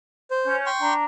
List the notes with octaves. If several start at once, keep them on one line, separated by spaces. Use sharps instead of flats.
C5
C#4 G6
G5 C6 C#6
D4 A#5